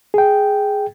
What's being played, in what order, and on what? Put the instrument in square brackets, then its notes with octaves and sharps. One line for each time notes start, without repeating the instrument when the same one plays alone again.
[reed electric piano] G#4 G5